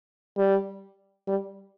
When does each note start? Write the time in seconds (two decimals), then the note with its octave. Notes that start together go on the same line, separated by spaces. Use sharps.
0.37 G3
1.27 G3